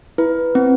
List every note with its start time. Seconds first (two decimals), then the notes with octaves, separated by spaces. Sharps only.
0.18 E4 B4
0.55 C4